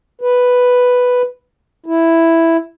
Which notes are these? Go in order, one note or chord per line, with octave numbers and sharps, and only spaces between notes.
B4
E4